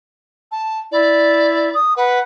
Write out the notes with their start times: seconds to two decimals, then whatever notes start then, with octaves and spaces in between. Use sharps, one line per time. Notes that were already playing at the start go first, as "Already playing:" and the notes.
0.52 A5
0.92 E4 D5
1.74 D#6
1.97 B4 F#5